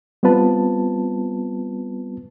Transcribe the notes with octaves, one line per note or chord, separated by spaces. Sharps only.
G3 B3 C4 F4 B4 A5